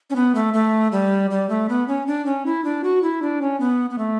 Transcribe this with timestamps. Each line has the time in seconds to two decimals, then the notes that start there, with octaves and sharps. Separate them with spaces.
0.10 C#4
0.16 B3
0.35 A3
0.54 A3
0.92 G3
1.31 G3
1.49 A3
1.69 B3
1.88 C#4
2.07 D4
2.26 C#4
2.46 E4
2.65 D4
2.84 F#4
3.03 E4
3.22 D4
3.42 C#4
3.60 B3
3.90 B3
3.98 A3